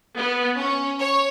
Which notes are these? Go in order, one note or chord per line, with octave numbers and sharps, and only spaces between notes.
B3
C#4
C#5